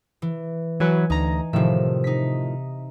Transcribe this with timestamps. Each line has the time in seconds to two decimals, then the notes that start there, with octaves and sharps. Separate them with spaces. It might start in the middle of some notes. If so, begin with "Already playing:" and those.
0.22 E3
0.80 E3 F#3 B4 G#5
1.10 D2 D#4 A#5
1.53 A2 C3 D#3 F3 E5
2.04 D#4 B6